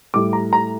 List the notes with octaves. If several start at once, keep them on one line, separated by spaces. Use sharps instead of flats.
A2 G3 D6
A#5
A#5